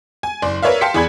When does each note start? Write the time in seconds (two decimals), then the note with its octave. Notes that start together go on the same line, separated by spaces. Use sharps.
0.23 G#5
0.42 F#1 D5 C6
0.62 A#4 B4 C#5 D5 E5 F5
0.81 F5 G5 A5 C6 B6 C#7
0.94 E2 G#4 D5 B5 G#6